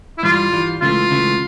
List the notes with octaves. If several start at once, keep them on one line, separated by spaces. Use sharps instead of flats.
E4
G2 E3 G3 F4
G2 E3 G3
C#2 C#3 E3 A3 F4
C#2 C#3 E3 A3